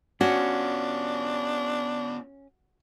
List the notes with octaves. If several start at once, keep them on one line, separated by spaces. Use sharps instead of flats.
B3 C#4 D4 F4 F#4